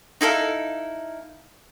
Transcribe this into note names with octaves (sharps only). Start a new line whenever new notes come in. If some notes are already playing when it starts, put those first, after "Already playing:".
D#4 E4 A4 F5